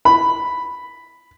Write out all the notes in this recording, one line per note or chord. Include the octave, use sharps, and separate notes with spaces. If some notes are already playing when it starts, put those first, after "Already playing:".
B5